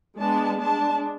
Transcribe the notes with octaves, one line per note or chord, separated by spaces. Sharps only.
G#3 B3 D4 A5
G#3 D4 A5